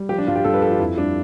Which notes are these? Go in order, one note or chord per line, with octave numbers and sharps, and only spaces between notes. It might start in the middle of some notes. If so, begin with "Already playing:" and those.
Already playing: G3
F3 G4
D4
G2 F4
G4
G2 A4
B4
F3 A4
F4
F2 E4
G3 D4